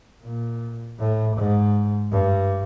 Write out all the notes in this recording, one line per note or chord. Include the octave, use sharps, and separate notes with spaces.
A#2
A2
G#2
G2